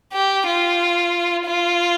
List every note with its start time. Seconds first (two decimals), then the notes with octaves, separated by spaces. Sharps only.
0.13 G4
0.46 F4
1.46 F4